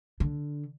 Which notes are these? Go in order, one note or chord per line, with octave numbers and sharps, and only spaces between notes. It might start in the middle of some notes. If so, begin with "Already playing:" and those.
D3